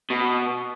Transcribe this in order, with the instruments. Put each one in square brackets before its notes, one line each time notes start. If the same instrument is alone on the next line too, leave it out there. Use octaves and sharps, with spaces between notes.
[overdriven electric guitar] B2